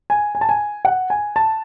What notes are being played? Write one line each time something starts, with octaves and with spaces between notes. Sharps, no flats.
G#5
G#5
A5
G#5
F#5
G#5
A5